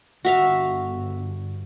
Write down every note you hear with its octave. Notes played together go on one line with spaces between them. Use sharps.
G1 G2 F#4 E5 F5